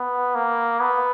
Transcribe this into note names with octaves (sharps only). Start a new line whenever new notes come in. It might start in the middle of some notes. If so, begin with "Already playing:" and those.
Already playing: B3
A#3
B3